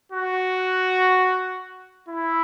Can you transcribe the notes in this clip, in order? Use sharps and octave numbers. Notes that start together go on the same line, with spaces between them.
F#4
E4